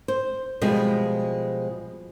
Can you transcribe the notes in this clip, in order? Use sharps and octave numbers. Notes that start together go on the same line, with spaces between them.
C5
B2 F3 G3 G#3